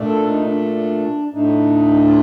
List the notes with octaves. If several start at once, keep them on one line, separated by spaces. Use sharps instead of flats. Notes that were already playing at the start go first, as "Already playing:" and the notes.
Already playing: A#2 A3 D4
A4
D#4
D4
A2 A3 D4 D#4
F4